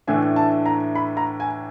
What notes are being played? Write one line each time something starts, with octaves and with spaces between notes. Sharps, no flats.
A2 E3 A3 D4 G#5
A5
A#5
B5
A#5
G#5